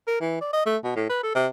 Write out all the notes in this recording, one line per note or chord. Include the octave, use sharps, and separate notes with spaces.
A#4
E3
D5
D#5
A3
B2
A2
B4
A4
C3